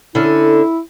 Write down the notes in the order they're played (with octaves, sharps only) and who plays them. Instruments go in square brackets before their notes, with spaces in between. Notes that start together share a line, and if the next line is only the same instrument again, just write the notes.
[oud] D3 C#4 [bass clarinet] E4